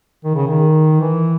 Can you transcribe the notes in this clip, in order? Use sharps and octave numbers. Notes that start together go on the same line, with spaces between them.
D#3
C#3
D#3
E3